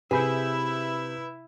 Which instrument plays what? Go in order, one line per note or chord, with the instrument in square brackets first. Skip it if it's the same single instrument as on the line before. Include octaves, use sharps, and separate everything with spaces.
[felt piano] C3 [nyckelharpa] E4 E5 [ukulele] G#4 [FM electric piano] B4 B5 G6